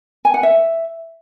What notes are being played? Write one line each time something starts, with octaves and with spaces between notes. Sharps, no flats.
G#5
F#5
E5